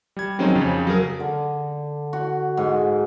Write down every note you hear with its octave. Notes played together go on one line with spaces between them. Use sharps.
G3 G#6
D#3 F#3 G#3 C4 C#4 D#4
F2 C#3
F#3 G#4 A#4
D3
F#4
G#2